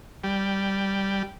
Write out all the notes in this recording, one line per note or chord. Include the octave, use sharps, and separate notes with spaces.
G3